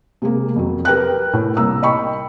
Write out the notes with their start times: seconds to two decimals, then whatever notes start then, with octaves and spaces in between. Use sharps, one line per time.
0.22 C3 G#3 A#3
0.56 F2 F#3
0.85 G4 A#4 B4 G5 F#6
1.33 A2
1.57 C2 A#3 A#5 E6
1.83 D#5 G5 B5 C#6